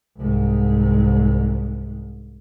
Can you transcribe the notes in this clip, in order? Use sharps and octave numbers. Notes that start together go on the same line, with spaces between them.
C2 G#2